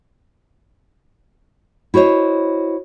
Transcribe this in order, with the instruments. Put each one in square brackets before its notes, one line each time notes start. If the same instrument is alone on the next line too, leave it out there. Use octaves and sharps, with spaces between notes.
[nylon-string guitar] E4 F#4 C5 C#5 D#5